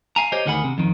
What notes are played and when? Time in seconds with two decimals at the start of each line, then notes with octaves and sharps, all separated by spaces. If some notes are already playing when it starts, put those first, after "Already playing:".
0.16 F5 G#5 A#5
0.32 G4 C5 C#5 D#5
0.46 D2 D#3 G#4 F#5 B5
0.64 C3
0.78 F2 D#3